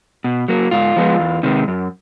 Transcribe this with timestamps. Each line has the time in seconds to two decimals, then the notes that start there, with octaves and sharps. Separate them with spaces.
0.24 B2
0.48 F#3 A#3
0.71 G#2 F4
0.96 F3 G#3 B3
1.19 E2
1.43 C3 D#3 G#3
1.68 F#2